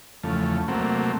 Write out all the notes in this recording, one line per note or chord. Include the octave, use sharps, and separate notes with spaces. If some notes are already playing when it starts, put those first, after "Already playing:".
E2 C#3 F3 A3
C3 F#3 A3 A#3 C4